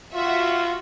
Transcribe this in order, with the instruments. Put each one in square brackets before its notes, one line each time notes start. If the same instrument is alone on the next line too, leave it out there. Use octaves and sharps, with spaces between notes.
[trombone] F4 [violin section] F#4 E5